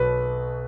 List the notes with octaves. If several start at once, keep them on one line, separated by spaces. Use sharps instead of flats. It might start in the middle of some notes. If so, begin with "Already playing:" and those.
Already playing: B1 B2 F#3 B4